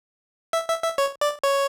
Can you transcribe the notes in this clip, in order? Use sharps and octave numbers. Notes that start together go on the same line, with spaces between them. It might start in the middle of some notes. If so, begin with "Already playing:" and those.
E5
E5
E5
C#5
D5
C#5